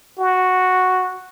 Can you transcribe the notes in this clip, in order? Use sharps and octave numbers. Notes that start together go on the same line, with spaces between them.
F#4